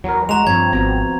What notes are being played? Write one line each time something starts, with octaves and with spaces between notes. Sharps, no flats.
E2 F#3 A#4
G#3 F#4 A#5 F7
G2 F3 C4 C#5 G#6
G#1 B3 C4 F#4 A#5